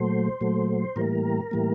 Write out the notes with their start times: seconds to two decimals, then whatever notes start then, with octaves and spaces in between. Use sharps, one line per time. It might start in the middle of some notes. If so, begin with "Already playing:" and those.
Already playing: A#2 F#3 A3 C5
0.41 A#2 F#3 A3
0.96 A2 E3 G3 A#3 A#4
1.51 A2 E3 G3 A#3